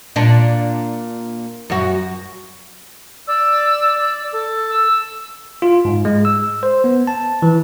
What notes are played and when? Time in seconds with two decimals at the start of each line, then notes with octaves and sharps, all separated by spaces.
0.16 A#2 D4
1.70 F#2 F#4
3.28 D5 E6
3.98 D5
4.33 A4
4.69 E6
5.62 F4
5.85 G#2
6.05 G#3
6.25 E6
6.63 C5
6.84 B3
7.07 A5
7.42 E3